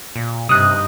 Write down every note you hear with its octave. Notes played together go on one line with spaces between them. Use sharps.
A#2
G2 C3 D#4 D#6 F#6